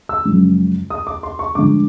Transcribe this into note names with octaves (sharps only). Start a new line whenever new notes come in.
E6
F#2 C#3 F3 G#3
D#6
D6
C6
C#6
G2 D3 F3 G#3 D6